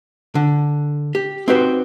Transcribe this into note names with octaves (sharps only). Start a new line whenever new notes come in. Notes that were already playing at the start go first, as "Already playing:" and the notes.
D3
G4
C4 D#4 F#4 G4 B4 C5